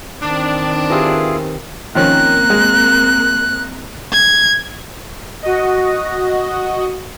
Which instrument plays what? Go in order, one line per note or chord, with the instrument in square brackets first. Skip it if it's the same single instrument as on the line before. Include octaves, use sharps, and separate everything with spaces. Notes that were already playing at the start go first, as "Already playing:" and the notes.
[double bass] D#3 C4 [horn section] D4
[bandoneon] E4 F4 G#4 [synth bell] G4 A#4 B4
[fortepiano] D#3 F3 C#4 [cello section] A#3 C4 A#4 [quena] F#6
[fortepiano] G#3
[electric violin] G#6
[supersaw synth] F#4 D#5